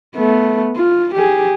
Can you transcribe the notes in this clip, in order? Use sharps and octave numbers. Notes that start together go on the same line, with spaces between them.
A3 B3
F4
G4 G#4